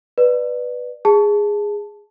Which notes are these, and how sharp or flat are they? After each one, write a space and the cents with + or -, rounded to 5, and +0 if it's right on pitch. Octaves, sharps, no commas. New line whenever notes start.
B4 +0 D5 +20
G#4 -10 A5 +0